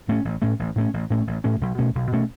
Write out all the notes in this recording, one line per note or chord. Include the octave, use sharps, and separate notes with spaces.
A2 A3 C#4
A1
A2 A3 C#4
A1
A2 A3 C#4
A1
A2 A3 C#4
A1
A2 A3 C#4
B1
B2 A3 C#4
B1
B2 A3 C#4